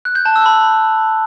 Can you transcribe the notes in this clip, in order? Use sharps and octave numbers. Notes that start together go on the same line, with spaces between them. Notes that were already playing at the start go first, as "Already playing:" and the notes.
F#6
G6
A5
E6
B5